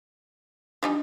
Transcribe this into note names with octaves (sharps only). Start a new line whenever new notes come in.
F3 G3 D4 D#4 G#5